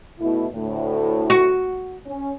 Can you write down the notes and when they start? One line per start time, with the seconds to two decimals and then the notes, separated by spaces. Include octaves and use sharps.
0.19 B2 A3 E4
0.53 D2 A2
1.30 F#4
2.06 C#4